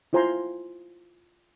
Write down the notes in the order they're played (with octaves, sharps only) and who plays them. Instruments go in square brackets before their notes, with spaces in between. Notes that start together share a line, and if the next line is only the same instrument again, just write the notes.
[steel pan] E4 F4 C5 G#5 A#5 C6